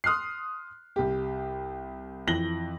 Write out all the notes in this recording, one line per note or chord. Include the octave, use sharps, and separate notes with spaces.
C6 D#6 F6 F#6 C7
C2 G4
F2 E3 A#6 F#7 G7